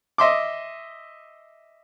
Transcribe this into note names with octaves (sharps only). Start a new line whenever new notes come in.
D#5 E5 C6 D6